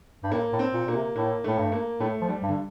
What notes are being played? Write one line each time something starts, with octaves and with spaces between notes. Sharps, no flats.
G2
A2 A#3
A2
C4
A#2
A#2 A#3
C3
A2 A#3
A2 A3
G2
A#3
A2 A3
F3
G3
G2
D3